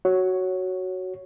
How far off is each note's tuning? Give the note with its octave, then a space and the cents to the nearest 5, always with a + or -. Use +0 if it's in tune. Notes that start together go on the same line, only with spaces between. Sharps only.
F#4 +5 C#5 +0